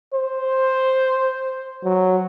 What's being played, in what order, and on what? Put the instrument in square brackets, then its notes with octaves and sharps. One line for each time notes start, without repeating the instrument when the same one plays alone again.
[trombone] C5
F#3